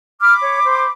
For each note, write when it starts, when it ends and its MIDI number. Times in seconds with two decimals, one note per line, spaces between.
0.21 0.92 83
0.21 0.92 86
0.21 0.34 89
0.42 0.60 73
0.65 0.86 72